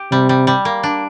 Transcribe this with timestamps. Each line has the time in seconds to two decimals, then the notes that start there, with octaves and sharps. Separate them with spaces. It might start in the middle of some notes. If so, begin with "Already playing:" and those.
Already playing: G4
0.11 C3 G3
0.29 G3
0.47 G3
0.65 A#3
0.83 D4